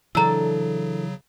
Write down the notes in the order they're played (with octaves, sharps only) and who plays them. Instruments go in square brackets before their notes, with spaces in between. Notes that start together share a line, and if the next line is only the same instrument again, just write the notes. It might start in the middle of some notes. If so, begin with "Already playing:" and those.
[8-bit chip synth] C#3 F#3 [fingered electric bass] E3 [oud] D4 A4 [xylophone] A#5 E6